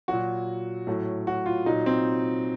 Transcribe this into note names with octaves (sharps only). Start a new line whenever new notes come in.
A#2 F#3 F#4
A2 F#3
F#4
F4
A#2 F#3 D#4
C4